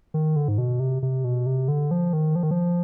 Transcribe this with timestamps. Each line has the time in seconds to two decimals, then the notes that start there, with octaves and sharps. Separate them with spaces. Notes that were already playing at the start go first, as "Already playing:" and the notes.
0.14 D#3
0.36 D3
0.48 G#2
0.58 B2
0.80 C3
1.03 C3
1.24 B2
1.46 C3
1.68 D3
1.91 F3
2.13 D#3
2.36 F3
2.43 D#3
2.51 F3